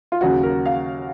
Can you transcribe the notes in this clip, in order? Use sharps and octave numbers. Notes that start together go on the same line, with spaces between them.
F4
D#2 C#3 F#3 F#4
A#4
F5